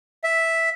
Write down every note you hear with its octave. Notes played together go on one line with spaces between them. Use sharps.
E5